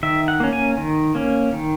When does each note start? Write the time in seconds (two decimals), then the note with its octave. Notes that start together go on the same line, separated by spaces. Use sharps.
0.03 D#3 E5
0.28 F#5
0.40 A#3 C#4
0.53 G#5
0.77 D#3
1.15 A#3 C#4
1.53 D#3